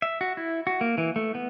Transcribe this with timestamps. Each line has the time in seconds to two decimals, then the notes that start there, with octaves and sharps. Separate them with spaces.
0.02 E5
0.21 F#4
0.37 E4
0.67 F#4
0.81 A#3
0.98 E3
1.16 A3
1.35 B3